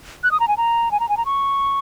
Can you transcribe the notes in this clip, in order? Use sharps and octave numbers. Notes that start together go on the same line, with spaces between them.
F#6
D#6
A#5
G#5
A#5
G#5
A#5
G#5
A#5
C#6